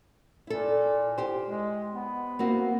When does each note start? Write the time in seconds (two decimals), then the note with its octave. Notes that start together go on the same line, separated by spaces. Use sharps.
0.47 A#2 E4 A4
1.18 G4 C5
1.47 G#3
1.95 B3
2.39 A#3 C4 F#4